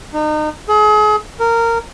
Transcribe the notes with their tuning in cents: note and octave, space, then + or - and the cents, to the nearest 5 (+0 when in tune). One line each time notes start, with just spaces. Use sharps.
D#4 -35
G#4 +35
A#4 -15